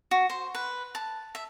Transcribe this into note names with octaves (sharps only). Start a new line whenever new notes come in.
F#4
C5
B4
A5
E5